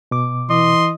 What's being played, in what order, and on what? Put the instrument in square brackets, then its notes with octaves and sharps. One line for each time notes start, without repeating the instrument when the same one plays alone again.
[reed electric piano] B2 D6
[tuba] E3 [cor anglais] D#5 [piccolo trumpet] C6